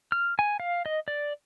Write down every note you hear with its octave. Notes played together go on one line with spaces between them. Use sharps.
F6
G#5
F5
D#5
D5